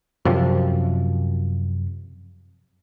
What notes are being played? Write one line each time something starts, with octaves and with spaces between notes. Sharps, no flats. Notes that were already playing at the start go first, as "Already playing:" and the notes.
F#2 C3 F3